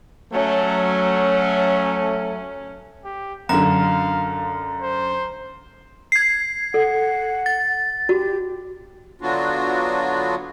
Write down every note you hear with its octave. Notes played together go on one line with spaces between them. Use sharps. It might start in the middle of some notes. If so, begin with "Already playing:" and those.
F#3 A3 C#4
G4
F#2 D3 F5 A#5
C5
G#6 C7
A4 F#5
A6
F#4 G4
D3 F#3 B3 D4 F4 F#4